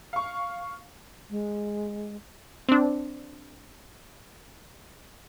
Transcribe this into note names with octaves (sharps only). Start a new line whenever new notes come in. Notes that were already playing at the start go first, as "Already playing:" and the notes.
F5 C#6
G#3
C4 D4